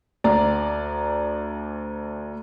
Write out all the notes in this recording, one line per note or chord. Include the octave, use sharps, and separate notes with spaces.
D2 D5 A#5